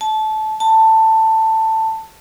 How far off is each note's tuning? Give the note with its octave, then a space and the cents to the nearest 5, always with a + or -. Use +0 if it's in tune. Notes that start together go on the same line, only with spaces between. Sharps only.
A5 -20
A5 +15